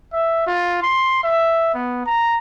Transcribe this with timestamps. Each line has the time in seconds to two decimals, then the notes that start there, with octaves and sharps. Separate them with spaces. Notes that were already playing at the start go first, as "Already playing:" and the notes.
0.13 E5
0.47 F4
0.82 C6
1.24 E5
1.74 B3
2.06 A#5